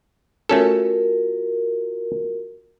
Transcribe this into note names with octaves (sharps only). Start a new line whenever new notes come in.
A3 C#4 F4 F#4 A4 A#4